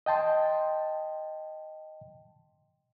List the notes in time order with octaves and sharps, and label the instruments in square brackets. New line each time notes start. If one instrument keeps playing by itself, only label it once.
[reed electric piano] D#5 G5 A5 C6